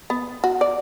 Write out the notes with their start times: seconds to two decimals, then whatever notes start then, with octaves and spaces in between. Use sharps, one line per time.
0.10 B3
0.44 F#4
0.61 D5